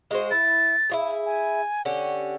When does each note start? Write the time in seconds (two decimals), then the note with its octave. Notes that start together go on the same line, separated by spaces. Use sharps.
0.11 G#3 F#4 C5
0.31 E4 A6
0.90 E4 F#4 G#4
1.25 G#5
1.85 D3 C#4 G4 F#5